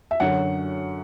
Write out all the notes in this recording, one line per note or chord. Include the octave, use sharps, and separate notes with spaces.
E5
F#2 D3 F#3 F#5